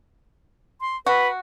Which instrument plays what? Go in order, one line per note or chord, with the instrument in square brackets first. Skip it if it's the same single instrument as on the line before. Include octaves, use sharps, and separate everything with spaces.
[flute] C6
[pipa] F#4 [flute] B4